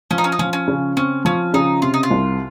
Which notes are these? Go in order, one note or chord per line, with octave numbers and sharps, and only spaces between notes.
F3 C#4
D#4
C#4
D#4
F3 C#4
C#4
C#3
C4 C#4
F3 C#4
C#3 D#4
C3 F4
D#4
F4
C2